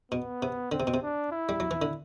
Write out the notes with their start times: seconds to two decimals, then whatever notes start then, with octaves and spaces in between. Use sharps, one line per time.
0.12 B2 B3
0.42 C3
0.72 D3 C4
0.80 C3
0.87 B2
0.94 C3
1.02 D4
1.32 E4
1.49 G3
1.60 F#3
1.71 E3
1.82 D3